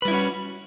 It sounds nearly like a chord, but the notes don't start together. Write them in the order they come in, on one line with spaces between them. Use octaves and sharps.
B4 G3 E4 C#4 F#4